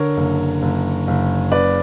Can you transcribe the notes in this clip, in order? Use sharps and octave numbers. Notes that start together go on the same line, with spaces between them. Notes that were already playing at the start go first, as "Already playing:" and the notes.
Already playing: D3 A#4 C#5
F#1
F#1
F#1
C#3 B4 D5